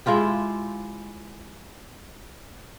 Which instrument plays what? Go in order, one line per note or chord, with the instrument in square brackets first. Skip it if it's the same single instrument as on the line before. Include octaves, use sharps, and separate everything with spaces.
[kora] G#3 E4 F4 G4